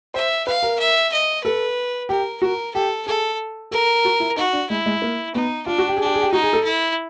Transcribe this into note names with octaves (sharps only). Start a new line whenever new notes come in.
C5 E5
B4 F5
A#4
E5
D#5
A4 B4
G4 A#4
F#4 A#4
G4 A4
G#4 A4
A4 A#4
F#4
E4
D#4 F#4
D4
G#3 E4
G#3
A#3
B3 D#4
D4 F4
F#4
G4
D4 G#4
G4
G#4
G4
D#4 F#4
G#4
A4
E4